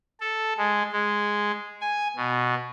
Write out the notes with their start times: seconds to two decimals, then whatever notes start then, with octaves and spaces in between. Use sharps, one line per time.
0.20 A4
0.58 G#3
0.92 G#3
1.81 G#5
2.16 B2